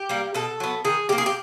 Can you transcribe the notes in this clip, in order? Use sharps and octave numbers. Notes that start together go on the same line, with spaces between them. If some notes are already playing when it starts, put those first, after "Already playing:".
Already playing: G4
G3 A#3
B2 A4
F#3 B3
D#3 G#4
G3 G4
A#3
G#4
G4